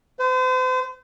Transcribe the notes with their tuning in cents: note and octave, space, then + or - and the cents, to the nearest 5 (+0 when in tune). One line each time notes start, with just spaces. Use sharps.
C5 -40